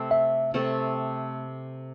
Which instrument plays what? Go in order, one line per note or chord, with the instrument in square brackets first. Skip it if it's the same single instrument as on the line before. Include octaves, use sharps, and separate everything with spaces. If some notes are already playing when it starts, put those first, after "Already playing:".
Already playing: [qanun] C3 A3 C4 A4
[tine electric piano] E5
[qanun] C3 A3 C4 A4